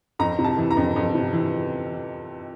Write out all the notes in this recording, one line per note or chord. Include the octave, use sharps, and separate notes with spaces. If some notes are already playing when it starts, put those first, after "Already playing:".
F2 A#5
C3
A5
E3
A#5
F2
F2
C3
E3